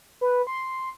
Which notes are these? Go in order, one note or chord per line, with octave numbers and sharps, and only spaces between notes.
B4
C6